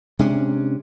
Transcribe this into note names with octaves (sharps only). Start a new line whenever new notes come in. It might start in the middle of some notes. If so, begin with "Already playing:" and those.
C3 G#3 C#4 D4